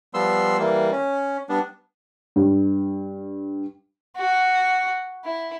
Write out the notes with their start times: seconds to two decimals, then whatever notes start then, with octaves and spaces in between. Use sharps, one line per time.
0.14 F3 G3 B3 C6 E6
0.59 E3 G3 A#3
0.92 C#4
1.49 G3 B3 D4
2.36 G2
4.17 F#4
5.24 E4